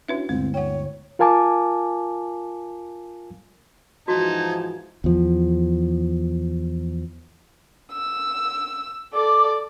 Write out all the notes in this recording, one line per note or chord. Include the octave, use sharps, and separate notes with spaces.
C#4 D4 E4 F#4 B4 E5
G1 D2 G#3 C4 E4
C#5 F#5 G5
F4 A#4 F5 G#5 A5 D6
G#2 E3 F3 D#4 F#4 A5 G#6
E2 F3
E6
A4 D5 D6